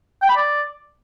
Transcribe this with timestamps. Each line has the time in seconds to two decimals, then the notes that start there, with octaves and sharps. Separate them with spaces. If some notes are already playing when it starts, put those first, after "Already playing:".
0.22 G5
0.29 B5
0.36 D5